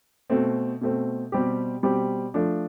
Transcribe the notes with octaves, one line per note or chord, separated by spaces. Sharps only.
B2 A3 C4
B2 A3 C4
B2 G3 C4 G4
B2 G3 C4 G4
F3 A3 D4